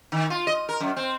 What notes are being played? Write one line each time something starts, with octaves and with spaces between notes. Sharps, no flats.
D#3
F4
D#5
A#4
F#2
C4